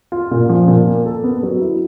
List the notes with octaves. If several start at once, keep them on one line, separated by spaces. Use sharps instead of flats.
F4
A#2
F3
A#2
A#3
A4
B3
F#3
E4